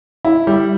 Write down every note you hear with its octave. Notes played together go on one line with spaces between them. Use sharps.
E4
G3